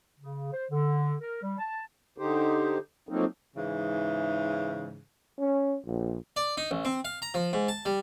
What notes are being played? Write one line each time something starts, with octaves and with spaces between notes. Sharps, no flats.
C#3
C5
D3
A#4
G3
A5
D3 D#4 G4 C5
F3 F#3 A3 A#3 C4 D#4
G#2 C#3 E3
C#4
A#1
D5
D#4
A1
C4
F5
A#5
F3
G#2
A5
G3